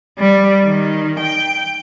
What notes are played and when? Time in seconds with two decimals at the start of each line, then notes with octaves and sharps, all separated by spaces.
0.18 G3
0.66 D#3
1.20 G5